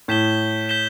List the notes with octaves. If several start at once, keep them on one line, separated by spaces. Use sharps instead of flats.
A2 G6 B6 E7 G7
G6 B6 E7 G7